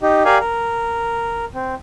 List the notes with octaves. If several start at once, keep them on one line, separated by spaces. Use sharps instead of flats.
D#4 G4
G4 A#4 D5 F5 G#5
A#4
C4